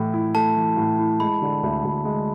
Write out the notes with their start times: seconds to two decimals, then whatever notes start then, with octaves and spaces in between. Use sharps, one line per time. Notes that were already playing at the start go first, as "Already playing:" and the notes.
Already playing: A2 E3 A3
0.14 E4
0.35 A3 A5
0.56 E3
0.77 A2
0.99 E4
1.20 G#3 B5
1.42 D3
1.63 D2
1.84 D2
2.05 G#3